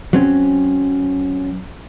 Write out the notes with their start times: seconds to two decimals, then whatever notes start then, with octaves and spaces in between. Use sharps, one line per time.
0.13 F#3 C4 C#4